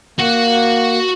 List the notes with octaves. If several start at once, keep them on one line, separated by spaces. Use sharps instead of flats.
A#3 F#4 F#5